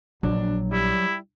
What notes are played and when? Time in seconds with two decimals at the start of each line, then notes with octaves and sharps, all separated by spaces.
0.23 A#1 B2 F#3 D4
0.71 G3 E4